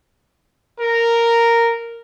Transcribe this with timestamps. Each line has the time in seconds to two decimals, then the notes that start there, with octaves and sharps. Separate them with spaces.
0.79 A#4